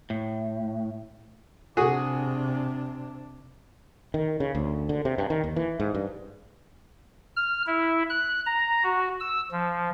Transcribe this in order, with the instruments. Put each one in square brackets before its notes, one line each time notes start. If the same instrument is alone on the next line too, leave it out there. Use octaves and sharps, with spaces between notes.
[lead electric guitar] A2
[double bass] C3 D4 [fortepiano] F#4 G#4
[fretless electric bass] D#3
C#3
D2
D3
C3
G2
D#3
D#2
E3
G#2
G2
[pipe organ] F6
E4
F#6
A#5
F#4
E6
F3